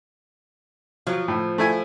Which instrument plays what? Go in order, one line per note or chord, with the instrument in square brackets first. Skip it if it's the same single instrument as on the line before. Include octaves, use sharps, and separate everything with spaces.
[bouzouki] F3 [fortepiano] F#3
[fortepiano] A2
A3 E4 G#5